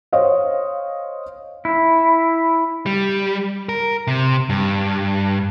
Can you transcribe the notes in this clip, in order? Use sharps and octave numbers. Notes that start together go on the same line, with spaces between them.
C5 C#5 D#5 F5
E4
G3
A#4
C3
G2